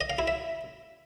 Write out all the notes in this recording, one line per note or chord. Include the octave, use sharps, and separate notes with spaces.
D#5
F5
E4
E5